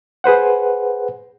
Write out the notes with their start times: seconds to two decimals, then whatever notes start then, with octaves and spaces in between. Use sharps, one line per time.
0.24 G#4 B4 C5 F#5